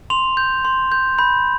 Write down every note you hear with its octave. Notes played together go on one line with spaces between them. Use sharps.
C6 F7
G6
C6
G6
B5 G6